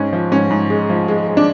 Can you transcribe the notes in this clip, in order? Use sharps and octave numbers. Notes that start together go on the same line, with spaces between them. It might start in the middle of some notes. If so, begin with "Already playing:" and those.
Already playing: G#2 C#4
F3
G#2 C#4
G#2
G#3
F3
G#3
G#3
D4